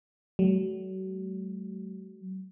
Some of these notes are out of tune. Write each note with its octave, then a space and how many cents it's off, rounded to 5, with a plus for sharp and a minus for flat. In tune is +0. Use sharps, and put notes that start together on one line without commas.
F#3 +35 A3 -35